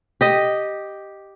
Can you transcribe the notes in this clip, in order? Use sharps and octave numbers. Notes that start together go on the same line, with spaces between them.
G4 D#5